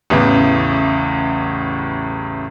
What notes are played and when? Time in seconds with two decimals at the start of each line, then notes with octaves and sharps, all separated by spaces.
0.10 A1 E2 A2 C#3